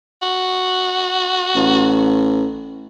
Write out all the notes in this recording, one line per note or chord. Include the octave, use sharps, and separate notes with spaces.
F#4
A1